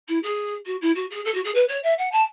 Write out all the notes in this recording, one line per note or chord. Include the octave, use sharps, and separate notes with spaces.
E4
G#4
F#4
E4
F#4
G#4
A4
F#4
G#4
B4
C#5
E5
F#5
A5